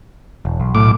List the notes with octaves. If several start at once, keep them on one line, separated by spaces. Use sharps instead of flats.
E1
B1
A2 D6